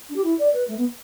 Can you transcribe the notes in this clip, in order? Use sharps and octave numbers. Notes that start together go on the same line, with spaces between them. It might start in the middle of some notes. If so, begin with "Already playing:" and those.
D4
G4
E4
D5
B4
A3
B3